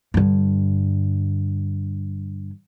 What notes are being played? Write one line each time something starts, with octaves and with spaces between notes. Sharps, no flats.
G2 D3